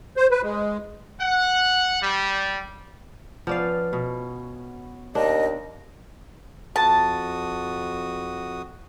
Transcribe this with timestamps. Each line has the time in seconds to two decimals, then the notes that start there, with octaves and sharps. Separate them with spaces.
0.17 C5
0.31 B4
0.43 G#3
1.21 F#5
2.03 G3
3.47 F3 B3 C#4 D5 F5
3.93 B2
5.15 D#2 D4 D#5
6.76 F2 F#4 A5 D#6